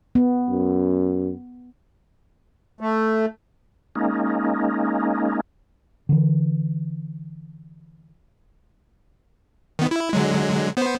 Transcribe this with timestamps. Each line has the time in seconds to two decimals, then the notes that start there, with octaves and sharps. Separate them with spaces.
0.15 B3
0.50 F#2
2.81 A3
3.95 G#3 A#3 C#4 D#4
6.09 D3 E3
9.79 D#3 B3
9.91 E4
10.13 D3 F#3 G#3
10.77 B3 C5